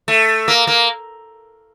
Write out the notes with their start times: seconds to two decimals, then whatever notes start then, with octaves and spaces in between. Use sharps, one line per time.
0.08 A3
0.48 A#3
0.67 A#3